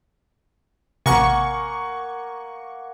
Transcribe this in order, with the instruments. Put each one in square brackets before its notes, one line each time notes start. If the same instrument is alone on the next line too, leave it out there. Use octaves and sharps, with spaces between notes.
[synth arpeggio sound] A1 C3 [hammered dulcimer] A#3 A#4 [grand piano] F#5 G#5 [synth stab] C#6